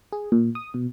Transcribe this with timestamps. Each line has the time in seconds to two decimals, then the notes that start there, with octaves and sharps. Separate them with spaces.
0.13 G#4
0.32 A#2
0.55 D#6
0.74 B2